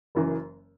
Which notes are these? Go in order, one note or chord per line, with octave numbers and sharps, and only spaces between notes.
F#1 F#2 E3